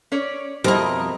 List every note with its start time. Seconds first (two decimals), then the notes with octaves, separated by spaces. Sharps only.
0.12 C#4 C#5 D5
0.64 F2 B2 G3 C4 E4 A#4 D#5